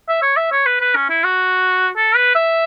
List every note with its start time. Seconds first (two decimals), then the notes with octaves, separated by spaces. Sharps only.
0.09 E5
0.22 C#5
0.37 E5
0.52 C#5
0.66 B4
0.81 B4
0.96 C#4
1.10 E4
1.24 F#4
1.96 A4
2.16 B4
2.35 E5